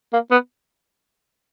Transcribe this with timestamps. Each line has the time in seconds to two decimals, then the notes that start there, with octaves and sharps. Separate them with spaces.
0.13 A#3
0.31 B3